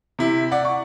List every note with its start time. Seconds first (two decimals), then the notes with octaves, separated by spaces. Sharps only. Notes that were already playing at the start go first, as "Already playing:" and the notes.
0.19 C3 E4
0.51 D5 F#5
0.65 C#6